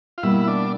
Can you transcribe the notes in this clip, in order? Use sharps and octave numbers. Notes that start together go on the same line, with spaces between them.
F4
B2 G3 A#3 E4
D4